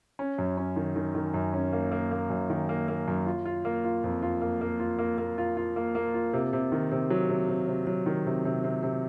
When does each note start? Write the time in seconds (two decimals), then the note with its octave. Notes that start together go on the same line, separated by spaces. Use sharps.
0.19 C#4
0.38 F#2
0.57 C#4
0.76 D#3
0.96 D#3
1.15 D#3
1.34 F#2
1.53 C#4
1.73 A#3
1.92 A#3
2.11 A#3
2.30 F#2
2.50 D#3
2.69 A#3
2.88 A#3
3.08 F#2
3.26 F4
3.46 F4
3.65 A#3
3.85 F4
4.04 F2
4.22 F4
4.41 A#3
4.61 A#3
4.80 F4
4.99 A#3
5.18 A#3
5.38 F4
5.57 F4
5.76 A#3
5.95 A#3
6.14 F4
6.33 C3
6.53 C3
6.72 D#3
6.92 C3
7.10 F#3
7.29 C3
7.49 C3
7.68 C3
7.87 F#3
8.06 D#3
8.26 C3
8.45 C3
8.64 C3
8.83 C3